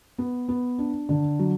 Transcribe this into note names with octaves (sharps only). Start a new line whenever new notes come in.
B3
B3
D4
D3
F#3